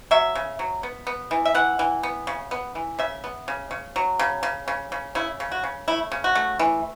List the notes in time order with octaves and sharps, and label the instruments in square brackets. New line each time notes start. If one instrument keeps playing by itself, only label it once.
[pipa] F#3 E5
C#3
F#3
B3
B3
E3
E5
E3 F#5
E3
B3
C#3
B3
E3
C#3 E5
B3
C#3
C#3
F#3
C#3
C#3
C#3
C#3
C#3 E4
C#3
F#4
C#3
A3 E4
C#3
F#4
A3
E3